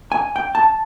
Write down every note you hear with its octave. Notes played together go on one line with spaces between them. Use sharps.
G#5
G5
A5